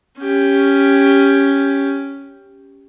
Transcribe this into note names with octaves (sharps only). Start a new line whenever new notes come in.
C#4 G4